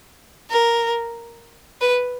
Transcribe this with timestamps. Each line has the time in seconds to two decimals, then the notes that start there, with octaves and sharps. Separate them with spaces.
0.50 A#4
1.81 B4